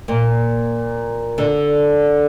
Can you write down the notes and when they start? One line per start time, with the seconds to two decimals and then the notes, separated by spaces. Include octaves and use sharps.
0.08 A#2
1.38 D3